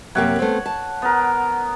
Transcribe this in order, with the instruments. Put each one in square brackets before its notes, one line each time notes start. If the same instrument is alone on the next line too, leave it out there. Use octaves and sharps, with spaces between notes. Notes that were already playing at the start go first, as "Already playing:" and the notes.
[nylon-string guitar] F#2 C3 A#3 [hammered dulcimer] C#5 F#5
[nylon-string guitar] A3 B3 C4
A5
[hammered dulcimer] B3 A#4